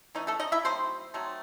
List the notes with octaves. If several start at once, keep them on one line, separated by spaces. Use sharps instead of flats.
E3 A3 C#4 D#4
A3 A4
D#4 D#5
E4 E5
F#3 A3 C4 D#4 C5 C6
F#3 A3 C4 D#4